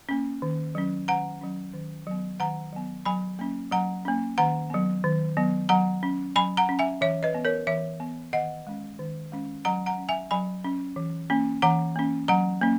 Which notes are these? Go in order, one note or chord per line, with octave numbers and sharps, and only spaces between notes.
A#3 C#4
D#3
F#3 C#4
D#3 F#5 A#5
F#3 C#4
D#3
F#3 B3
D#3 F#5 A#5
F#3 B3
F#3 G#5 B5
A#3 C#4
F#3 F#5 A#5
A#3 C#4
D#3 F#5 A#5
F#3 B3
D#3
F#3 B3
F#3 F#5 A#5
C#4
F#3 G#5 B5
F#5 A#5
C#4
E5 G#5
E3 C#5 E5
B4 D#5
B3
A#4 C#5
E3 C#5 E5
B3
D#3 D#5 F#5
G#3 C#4
D#3
G#3 C#4
F#3 F#5 A#5
F#5 A#5
C#4
E5 G#5
F#3 G#5 B5
C#4
E3
A#3 C#4
E3 F#5 A#5
A#3 C#4
F#3 F#5 A#5
A#3 C#4